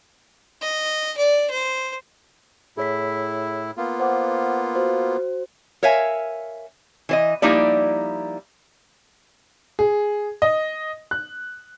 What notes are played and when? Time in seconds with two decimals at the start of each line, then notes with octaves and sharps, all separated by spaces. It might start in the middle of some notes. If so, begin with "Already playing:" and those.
0.62 D#5
1.17 D5
1.50 C5
2.77 A2 E4 G#4 C#5 B6
3.77 A#3 B3 F4
4.00 C5 F#5 D6
4.75 F#4 C5
5.83 A#4 C#5 E5 F5 G#5
7.09 E3 C5 D#5
7.42 F3 G3 A#3 D#4 E4 D5
9.79 G#4
10.42 D#5
11.11 F#6